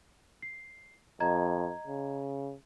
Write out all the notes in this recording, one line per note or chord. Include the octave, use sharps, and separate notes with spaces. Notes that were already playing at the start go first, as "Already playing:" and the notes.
C7
F2 D#5 A#5 G#6
C#3